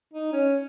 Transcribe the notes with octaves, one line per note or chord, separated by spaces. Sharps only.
D#4
C#4